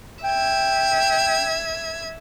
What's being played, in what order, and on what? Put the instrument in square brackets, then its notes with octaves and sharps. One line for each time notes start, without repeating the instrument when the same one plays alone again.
[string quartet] E5 G#6 [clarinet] G5